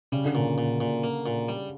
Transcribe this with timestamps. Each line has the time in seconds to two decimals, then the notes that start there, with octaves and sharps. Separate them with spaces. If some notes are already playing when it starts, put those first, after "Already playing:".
0.12 C#3 G3
0.25 D3
0.35 A#2 C#3
0.58 A#2
0.80 A#2
1.04 A#3
1.26 A#2
1.49 G3